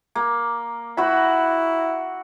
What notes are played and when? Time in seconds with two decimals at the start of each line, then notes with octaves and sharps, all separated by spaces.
0.15 A#3
0.97 E4 F#4 B5